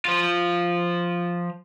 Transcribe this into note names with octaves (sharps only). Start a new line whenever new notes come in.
F3 F4